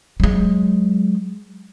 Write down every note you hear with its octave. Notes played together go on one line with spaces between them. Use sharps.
F#3 G#3